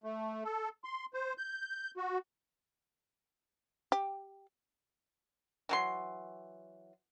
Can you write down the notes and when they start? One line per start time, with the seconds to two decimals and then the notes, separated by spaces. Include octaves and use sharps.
0.04 A3
0.44 A4
0.84 C6
1.14 C5
1.38 G6
1.97 F#4
3.92 G4
5.69 E3 F#3 C6